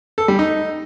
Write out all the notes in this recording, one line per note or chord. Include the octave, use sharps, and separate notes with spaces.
A4
G3
D#4